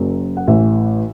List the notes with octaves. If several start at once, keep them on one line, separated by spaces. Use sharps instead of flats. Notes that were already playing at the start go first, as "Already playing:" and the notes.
Already playing: F#1 F#2 F#3
F#5
A1 A2 E3 E5